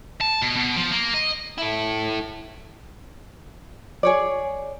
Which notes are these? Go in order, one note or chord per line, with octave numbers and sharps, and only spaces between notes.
A5
B2
B2
F3
A#3
D#5
E4 A4
G#4 C#5 D5